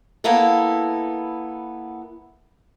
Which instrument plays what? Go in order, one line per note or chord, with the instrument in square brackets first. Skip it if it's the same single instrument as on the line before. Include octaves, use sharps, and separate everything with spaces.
[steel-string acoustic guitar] A#3 B3 E4 A4